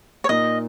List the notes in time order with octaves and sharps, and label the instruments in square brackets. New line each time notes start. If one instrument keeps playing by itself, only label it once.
[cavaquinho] C#5
[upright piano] A#2 A#3 D#4 [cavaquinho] D#5